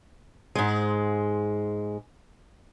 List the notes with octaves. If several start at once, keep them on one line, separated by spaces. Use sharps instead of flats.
G#2 G#3